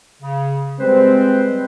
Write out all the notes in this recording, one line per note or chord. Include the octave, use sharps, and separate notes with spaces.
C#3
G3 G#3 C4 B4 C5